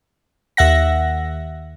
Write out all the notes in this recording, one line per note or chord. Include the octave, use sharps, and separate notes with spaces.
D#2 E5 F#5 A#6